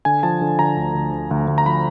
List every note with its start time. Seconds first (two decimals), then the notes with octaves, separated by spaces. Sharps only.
0.05 D3 G#5
0.23 F3 A5
0.41 D3
0.59 D3 A#5
0.77 D2
0.95 D2
1.12 D2
1.31 D2
1.48 D2
1.58 A#5
1.66 F3 B5